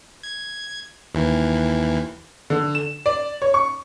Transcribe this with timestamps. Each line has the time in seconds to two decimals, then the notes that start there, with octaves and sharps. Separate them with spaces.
0.23 G#6
1.15 D#2 E3
2.50 D3
2.75 E7
3.06 D5
3.42 C#5
3.54 C#6